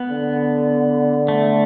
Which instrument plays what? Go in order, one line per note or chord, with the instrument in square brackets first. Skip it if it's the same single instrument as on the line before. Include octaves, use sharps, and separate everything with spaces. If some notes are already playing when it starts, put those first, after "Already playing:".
Already playing: [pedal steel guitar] B3
[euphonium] D3
[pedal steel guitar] A3